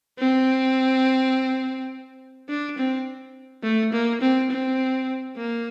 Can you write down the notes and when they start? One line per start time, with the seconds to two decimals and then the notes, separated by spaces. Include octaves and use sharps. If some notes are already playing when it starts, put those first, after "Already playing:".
0.19 C4
2.49 D4
2.78 C4
3.63 A3
3.93 A#3
4.21 C4
4.51 C4
5.37 A#3